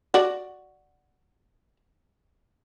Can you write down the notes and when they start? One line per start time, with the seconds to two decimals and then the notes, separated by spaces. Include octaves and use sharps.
0.14 F#4 D5